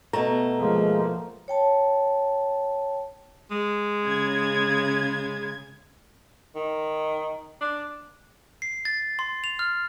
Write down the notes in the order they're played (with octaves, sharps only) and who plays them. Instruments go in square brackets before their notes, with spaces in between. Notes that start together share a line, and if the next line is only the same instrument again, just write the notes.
[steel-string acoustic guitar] B2 A3 [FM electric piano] A#5
[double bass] F3 A#3 [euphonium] G#3
[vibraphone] C#5 G5 A5
[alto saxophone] G#3
[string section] C#3 G#6
[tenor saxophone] D#3
D4
[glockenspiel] C7
A6
C6
F7
F6